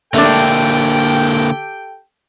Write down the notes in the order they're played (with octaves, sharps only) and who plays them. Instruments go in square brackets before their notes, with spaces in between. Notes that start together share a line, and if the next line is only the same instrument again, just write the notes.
[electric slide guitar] D3 A#3 [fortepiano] A3 D4 [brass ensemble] G4 A4 G5